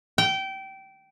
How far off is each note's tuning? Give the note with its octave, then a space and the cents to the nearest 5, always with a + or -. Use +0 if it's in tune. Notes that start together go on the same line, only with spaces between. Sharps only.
G5 -20